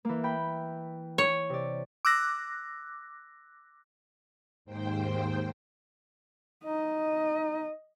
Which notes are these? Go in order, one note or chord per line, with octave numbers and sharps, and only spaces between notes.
E3 A#3
G5 B5
C#5
C3 D5
D6 E6 F#6 A#6
D#2 G#2 C5 G5
D#4 D#5